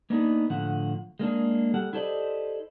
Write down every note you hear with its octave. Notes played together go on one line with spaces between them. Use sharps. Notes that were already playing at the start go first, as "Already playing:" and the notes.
A#3 B3 D4 D#4 G#4
A2 D3 F3 F#5
G#3 A#3 D4 G#4
G3 A4 F#5
E4 G4 A4 C5 D5 D#5